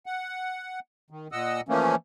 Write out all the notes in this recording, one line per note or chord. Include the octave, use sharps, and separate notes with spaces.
F#5
D#3
A#2 D#5 F#5 E6
E3 F3 A3 A#3 C#4